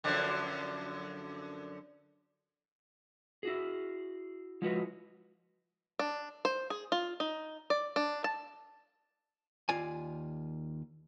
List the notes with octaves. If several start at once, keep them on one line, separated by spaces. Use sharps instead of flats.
F#2 D3 F3
E4 F#4 G#4
F3 G#3 E4 F#4 B4
D4
C5
G#4
F4
D#4
D5
D4
A5
D#2 F4 D5 G#5